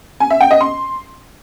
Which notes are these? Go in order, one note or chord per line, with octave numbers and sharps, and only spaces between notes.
G#5
E5
G5
D#5
C6